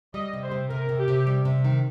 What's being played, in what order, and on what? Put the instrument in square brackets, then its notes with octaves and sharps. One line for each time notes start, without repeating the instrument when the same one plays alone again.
[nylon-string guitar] G3 [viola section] D#5
[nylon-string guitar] C3
[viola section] C5
[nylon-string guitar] C3
[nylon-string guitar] C3 [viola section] A#4
[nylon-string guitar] C3
[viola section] G4
[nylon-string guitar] C3
G3
C3
D#3